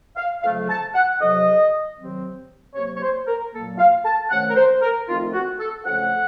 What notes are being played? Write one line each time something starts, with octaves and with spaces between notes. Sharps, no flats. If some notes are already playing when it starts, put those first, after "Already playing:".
F5
F2 C#3 F#3 A3 F5
A5
F#5
F2 C3 F#3 D#5
C3 D#3 F#3 C4
C3 F#3 A#3 C#5
C#5
C5
A#4
A#2 F#3 A#3 A4
F5
A5
C3 D#3 A3 C#4 F#5
A#4
C5
A#4
F2 D#3 A3 C4 F4
F#4
A4
F2 C#3 A3 C#4 F#5